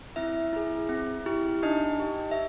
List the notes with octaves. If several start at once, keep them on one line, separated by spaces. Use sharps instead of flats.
C4 E4 E5
E4 G#4
C4
E4 G4
D4 D#4 D#5
G4
E5